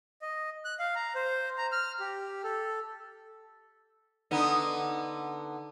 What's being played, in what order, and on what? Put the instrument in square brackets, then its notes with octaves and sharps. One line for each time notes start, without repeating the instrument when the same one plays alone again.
[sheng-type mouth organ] D#5
F#6
F5
A#5
C5
A#5
F6
G4
A4
[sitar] D3 B3 D#4